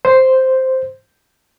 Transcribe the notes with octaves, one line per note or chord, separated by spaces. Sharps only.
C5